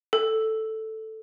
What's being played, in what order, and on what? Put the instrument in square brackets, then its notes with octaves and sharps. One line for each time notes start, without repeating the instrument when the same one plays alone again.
[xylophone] A4